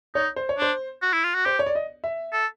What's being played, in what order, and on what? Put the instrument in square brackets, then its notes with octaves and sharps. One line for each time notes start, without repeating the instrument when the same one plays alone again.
[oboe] D#4 [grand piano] C#5
[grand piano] C5
C#5
[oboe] D4 [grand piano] C5
[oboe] F#4
E4
F4
F#4
[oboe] G4 [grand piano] C5
[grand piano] C#5
D5
D#5
E5
[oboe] A4